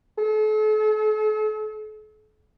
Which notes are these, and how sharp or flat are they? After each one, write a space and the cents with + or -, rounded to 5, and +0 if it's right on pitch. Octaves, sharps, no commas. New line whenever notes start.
A4 -40